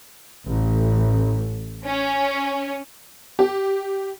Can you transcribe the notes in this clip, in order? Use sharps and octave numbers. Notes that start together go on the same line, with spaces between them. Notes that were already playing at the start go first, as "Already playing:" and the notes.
A1
C#4
G4